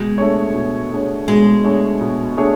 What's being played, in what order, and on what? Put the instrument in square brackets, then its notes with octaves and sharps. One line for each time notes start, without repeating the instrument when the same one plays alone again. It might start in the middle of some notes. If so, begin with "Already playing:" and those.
Already playing: [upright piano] B2 [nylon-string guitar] G#3
[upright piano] A3 D4 G#4 C#5
B2
A3 D4 G#4 C#5
[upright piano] B2 [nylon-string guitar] G#3
[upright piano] A3 D4 G#4 C#5
B2
A3 D4 G#4 C#5